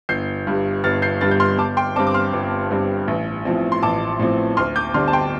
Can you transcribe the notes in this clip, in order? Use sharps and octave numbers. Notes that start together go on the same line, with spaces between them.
G1 G6 C7
G2 G3
G1 F6 A6
G6 C7
G2 G3 F6 A6
G6
C6 F6
G1 A5 D6
G5 C6
G2 G3 C4 A5 D6
D6
C6 F6
G1
G2 G3 C4
A1
A2 F3 C4
C6
A1 A5 D6
A2 F3 C4
D2 C6 F6
D6 G6
D3 G3 D4 C6 F6
A5
G5 C6